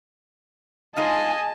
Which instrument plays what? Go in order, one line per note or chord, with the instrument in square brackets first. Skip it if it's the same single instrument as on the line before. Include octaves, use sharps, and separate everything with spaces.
[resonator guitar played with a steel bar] G#3 D#4 F4 [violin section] G#4 G#5 [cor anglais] D#5 [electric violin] A5